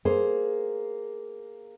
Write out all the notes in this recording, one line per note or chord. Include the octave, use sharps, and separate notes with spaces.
A#3 G#4 C5